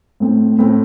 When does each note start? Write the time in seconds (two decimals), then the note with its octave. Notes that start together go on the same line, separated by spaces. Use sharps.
0.20 A2 A3 C4
0.59 A2 A3 C4